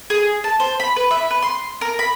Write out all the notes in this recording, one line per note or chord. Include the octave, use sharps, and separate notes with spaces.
G#4
A5
C5
B5
B4
E5
B4
C6
A#4
B5